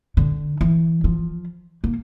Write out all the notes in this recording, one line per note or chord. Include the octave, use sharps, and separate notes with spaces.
D3
E3
F3
A#3